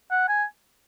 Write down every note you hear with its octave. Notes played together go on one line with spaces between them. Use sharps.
F#5
G#5